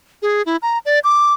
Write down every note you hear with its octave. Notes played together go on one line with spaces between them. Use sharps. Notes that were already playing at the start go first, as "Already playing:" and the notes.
G#4
E4
A#5
D5
D6